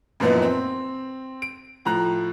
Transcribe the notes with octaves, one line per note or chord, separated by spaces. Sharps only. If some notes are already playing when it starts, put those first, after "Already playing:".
F#2 A#2 E3 F3 B3 D#4
C4
D7
A2 F3 A#5 F#6